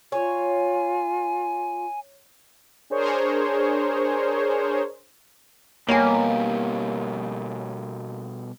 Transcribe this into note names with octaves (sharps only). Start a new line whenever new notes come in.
F4 C#5 G#5
D4 G#4 A#4 C5 C#5
B2 G3 A#3 G4 C#5 G#5